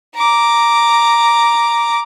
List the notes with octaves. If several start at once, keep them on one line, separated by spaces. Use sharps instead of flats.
A#5 D6